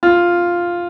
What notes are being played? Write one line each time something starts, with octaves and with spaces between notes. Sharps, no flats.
F4